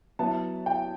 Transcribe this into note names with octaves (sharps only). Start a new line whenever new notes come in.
F#3 B3 E4 A5
G5